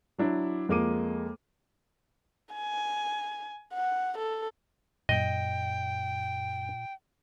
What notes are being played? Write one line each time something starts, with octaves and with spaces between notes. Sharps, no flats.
F#3 D4 E4
F2 G#3 A#3 D6 D#7
G#5
F#5
A4
F#2 A#2 D#5 G5